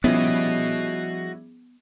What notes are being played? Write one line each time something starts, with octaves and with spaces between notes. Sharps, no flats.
F3 G3 B3 C#4 E4 F#4 G#4 D#5